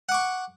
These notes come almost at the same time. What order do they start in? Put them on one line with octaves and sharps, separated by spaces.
F#5 D6 C#6